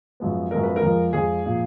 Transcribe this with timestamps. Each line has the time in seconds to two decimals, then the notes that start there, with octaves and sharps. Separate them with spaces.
0.20 F#2 F3 G#3 B3
0.51 F#2 F3 G#3 B3 A#4
0.63 B4
0.76 A#4
0.82 F2 F3 G#3
1.13 F2 F3 G#3 G#4
1.44 A#2 F3